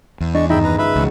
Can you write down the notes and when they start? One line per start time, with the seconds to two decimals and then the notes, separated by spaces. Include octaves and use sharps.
0.20 E2
0.34 G#3 D4 D#5 C#6
0.49 G#1 C#2 G2 D#4 E5 G5 B5
0.64 A#3 B4 A#5
0.78 G#3 F4 B4 D#5 E5 B5
0.96 E1 C#2 G#3 F#4